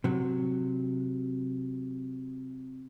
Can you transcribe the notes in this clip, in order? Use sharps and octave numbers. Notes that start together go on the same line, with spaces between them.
C3 F#3